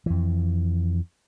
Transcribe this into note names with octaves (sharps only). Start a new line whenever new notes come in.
F2 E3